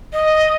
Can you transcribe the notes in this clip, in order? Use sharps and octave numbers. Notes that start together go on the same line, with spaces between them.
D#5